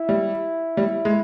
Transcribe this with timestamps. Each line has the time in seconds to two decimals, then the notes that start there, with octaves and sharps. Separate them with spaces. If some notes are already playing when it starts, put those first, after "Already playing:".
Already playing: E4
0.09 G3
0.77 G3
1.05 G#3